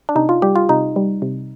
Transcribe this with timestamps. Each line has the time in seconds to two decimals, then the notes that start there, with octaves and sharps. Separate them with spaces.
0.09 D4
0.15 C3 D#4
0.29 F4
0.42 G3 G4
0.56 F4
0.69 C3 D#4
0.96 G3
1.22 C3